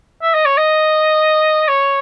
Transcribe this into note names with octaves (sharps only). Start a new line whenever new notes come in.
E5
D#5
C#5
D#5
C#5